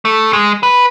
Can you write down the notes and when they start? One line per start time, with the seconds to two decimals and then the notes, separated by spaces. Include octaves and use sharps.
0.05 A3
0.33 G#3
0.63 B4